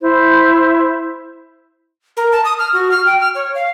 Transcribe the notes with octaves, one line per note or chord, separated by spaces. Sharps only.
E4 C5
A#4
A5
D#6
F6
F#4
F6
G5
F6
C#5
F5